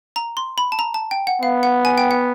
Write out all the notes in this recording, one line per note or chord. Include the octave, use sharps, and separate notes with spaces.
A#5
C6
B5
A5
A#5
A5
G5
F#5
B3 F5
F#5
G#5
G5
F#5